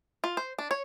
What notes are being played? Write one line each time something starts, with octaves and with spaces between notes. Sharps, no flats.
F4
C5
D4
C#5